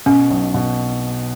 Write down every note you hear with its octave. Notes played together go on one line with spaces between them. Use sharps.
B2 C#4
B1
B2